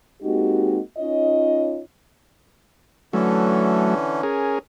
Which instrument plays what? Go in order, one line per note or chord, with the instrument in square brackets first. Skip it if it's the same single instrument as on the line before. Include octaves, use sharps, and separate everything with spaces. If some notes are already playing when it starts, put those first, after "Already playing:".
[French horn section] G#3 A#3 C4 D#4 F#4 G4
C#4 D#4 F4 C#5 D#5
[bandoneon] D3 E3 C#4 [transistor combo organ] F#3 A3
[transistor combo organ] C#4 G#4 A#4